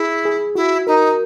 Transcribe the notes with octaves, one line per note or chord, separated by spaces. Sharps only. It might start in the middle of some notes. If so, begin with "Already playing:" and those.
Already playing: E4 G#4
G#4
E4 F#4
D#4 A#4